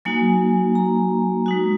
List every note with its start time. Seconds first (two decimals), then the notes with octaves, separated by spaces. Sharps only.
0.05 F#3 A#3 D#4 F#4 G#5
0.75 A#5
1.46 G#3 D#4 F#4